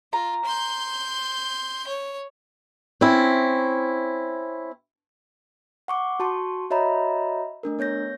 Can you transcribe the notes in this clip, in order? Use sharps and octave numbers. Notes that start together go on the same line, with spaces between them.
F4 A#5
C6 G6
C#5
C4 C#4 E4
F#5 C#6 D6
F#4 A5 C6 C#6
F#4 C#5 D#5 E5 A#5 B5
A3 D4 A#4
B3 C#5 G6 A#6